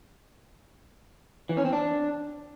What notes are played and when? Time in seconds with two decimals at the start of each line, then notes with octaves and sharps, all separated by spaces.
1.49 E3
1.57 C#4
1.65 C4
1.73 D4